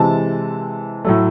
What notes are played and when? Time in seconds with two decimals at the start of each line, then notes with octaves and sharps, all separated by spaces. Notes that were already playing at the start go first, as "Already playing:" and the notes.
Already playing: C3 E3 G#3 A5
1.05 A2 F#3 A3